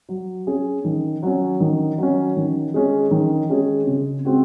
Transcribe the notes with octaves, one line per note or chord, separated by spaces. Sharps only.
F#3
C#4 G#4
D#3
F#3 C#4
D#3
F#3 C#4
D#3
G#3 C#4 G#4
D#3
G#3 C#4 G#4
C#3
G#3 C4 F#4